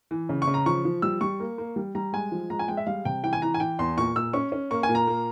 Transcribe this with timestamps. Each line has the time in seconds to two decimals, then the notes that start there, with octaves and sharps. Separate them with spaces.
0.11 E3
0.29 C#3
0.42 C#6
0.47 C#3
0.54 A#5
0.66 F3 C#6
0.85 F3
1.02 G3 E6
1.21 G3 C#6
1.40 A#3
1.58 A#3
1.76 G3
1.95 G3 A#5
2.13 G#3 G#5
2.32 F3
2.50 G#3 A#5
2.59 G#5
2.68 G#3 G5
2.77 E5
2.86 G3 F5
3.05 C3 G5
3.23 E3 G5
3.33 G#5
3.42 E3 A#5
3.54 G#5
3.60 E3 G5
3.79 E2 C6
3.98 A#2 C#6
4.16 A#2 E6
4.33 C#4 C#6
4.52 C#4
4.71 A#3 C#6
4.83 G#5
4.89 A#2
4.95 A#5
5.07 A#3